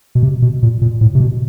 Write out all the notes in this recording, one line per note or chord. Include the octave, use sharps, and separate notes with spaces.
B2
C3
B2
A#2
A#2
A2
C3
B2